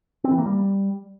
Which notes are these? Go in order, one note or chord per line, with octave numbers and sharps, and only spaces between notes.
C4
E3
A#3
G3